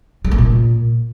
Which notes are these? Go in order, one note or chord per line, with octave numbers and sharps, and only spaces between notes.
G3
A3
A#2